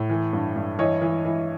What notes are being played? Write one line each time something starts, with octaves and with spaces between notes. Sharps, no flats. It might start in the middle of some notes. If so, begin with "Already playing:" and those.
Already playing: A2
E3
G2
G2
E3 C#5 D#5
E3
E3